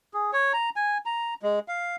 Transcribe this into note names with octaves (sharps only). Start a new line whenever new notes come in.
G#4
C#5
A#5
G#5
A#5
G#3
F5